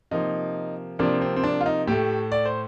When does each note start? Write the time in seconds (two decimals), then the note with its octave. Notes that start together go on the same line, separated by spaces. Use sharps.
0.11 C3 F3 A#3 D#4
0.99 C3 F3 A#3 D4
1.21 C4
1.36 C4
1.44 D4
1.61 F4
1.66 D#4
1.88 A2 A3 G4
2.32 D5
2.46 C5